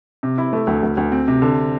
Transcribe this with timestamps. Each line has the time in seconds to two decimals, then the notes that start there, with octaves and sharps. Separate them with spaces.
0.23 C3
0.38 E4
0.53 A3
0.67 D2
0.83 D2
0.97 D2
1.12 C4
1.28 C3
1.42 D3